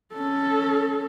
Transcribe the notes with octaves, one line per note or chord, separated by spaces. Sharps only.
C#4 A4